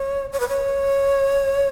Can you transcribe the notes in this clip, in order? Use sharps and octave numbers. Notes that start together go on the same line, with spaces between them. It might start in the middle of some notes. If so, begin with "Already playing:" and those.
Already playing: C#5
C#5
B4
C#5